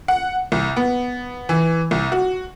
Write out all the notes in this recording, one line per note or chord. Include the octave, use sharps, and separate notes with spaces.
F#5
C2
B3
E3
C2
F#4